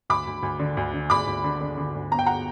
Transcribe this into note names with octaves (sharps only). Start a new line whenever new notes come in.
D2 B5 D6
D2
D2
D3
D2
D3
D2 B5 D6
D2
D3
D3
D3
D2
G1 A#5
G5
F#5 A#5